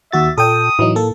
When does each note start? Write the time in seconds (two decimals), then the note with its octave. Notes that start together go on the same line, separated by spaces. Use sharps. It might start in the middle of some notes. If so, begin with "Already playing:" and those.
0.12 D#2 F#4 E5 A6
0.38 A#2 A4 G5 D#6
0.79 A2 E3 F#3 D#4
0.95 A#3 A4